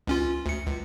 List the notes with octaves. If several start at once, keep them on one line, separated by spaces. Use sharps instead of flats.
C#2 C#4 F4
D2 C#7
C#2